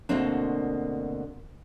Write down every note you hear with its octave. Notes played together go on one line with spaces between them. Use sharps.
D2 B2 A#3 C4 D4